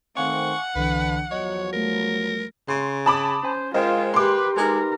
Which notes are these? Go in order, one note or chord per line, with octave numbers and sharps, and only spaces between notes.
D#3 A3 C4 F5 F#5 G#5 C#6 D6
C2 D3 E3 B4
E2 F3 F#3 C#5 D#5
G3 A3 A#4
C#3 C6
A5 B5 D6 D#6
C#4 C5 G#5
G#3 F4 A#4 C5 D#5 G5
G4 B4 C6 D6
G#3 D#4 G4 A#4 B4